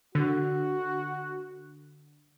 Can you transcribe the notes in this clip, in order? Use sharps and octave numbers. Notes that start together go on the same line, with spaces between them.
D3 F#4